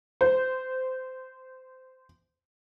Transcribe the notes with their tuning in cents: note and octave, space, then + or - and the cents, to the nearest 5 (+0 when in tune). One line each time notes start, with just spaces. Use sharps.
C5 -20